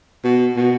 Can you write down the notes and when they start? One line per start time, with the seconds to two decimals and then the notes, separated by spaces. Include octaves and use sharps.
0.24 B2
0.56 B2